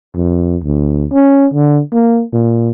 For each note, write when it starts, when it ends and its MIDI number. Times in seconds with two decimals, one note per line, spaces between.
0.15 0.56 41
0.64 1.06 38
1.11 1.47 61
1.53 1.80 50
1.93 2.23 58
2.33 2.71 46